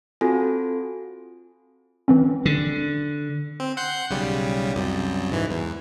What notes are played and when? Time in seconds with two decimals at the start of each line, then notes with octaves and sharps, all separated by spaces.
0.21 C4 F4 F#4 A4 G#5
2.08 E3 C4 C#4
2.45 D3
3.60 C4
3.77 F#5 C6 G6
4.10 B1 C#3 G3
4.75 C2 F#2
5.32 G#2 E3
5.51 E2